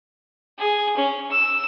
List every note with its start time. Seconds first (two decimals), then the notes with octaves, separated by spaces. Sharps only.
0.58 G#4
0.97 C#4
1.31 E6